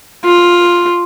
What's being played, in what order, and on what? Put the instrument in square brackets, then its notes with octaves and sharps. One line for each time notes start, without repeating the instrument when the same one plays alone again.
[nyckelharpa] F4